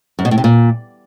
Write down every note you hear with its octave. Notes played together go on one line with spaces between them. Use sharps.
F#2
B2
A2
C3
A#2